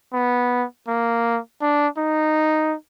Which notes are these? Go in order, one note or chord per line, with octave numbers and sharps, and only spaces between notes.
B3
A#3
D4
D#4